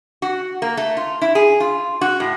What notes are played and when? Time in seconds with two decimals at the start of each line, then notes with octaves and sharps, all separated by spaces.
0.22 F#4
0.62 A#3
0.77 A3
0.97 F4
1.22 E4
1.35 G#4
1.60 F4
2.01 F#4
2.20 A2